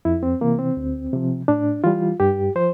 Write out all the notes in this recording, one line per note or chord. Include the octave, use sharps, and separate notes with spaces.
F2 E4
C4
C3 E3 A#3
C4
D2
C3 F3
A2 D4
E3 G3 F4
G2 G4
F3 C5